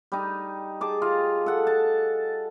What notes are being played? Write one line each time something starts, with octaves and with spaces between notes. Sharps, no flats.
G3 D#4
G#4 A5 D6
F4 D#5
A4 F#5
A5